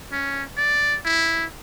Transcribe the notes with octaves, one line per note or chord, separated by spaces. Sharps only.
C#4
D5
E4